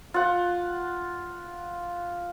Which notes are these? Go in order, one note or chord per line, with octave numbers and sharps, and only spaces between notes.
F4 F#5